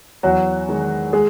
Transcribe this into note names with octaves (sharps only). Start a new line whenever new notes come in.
E2 F#3 F#4
D#3 G#3
G#3 G#4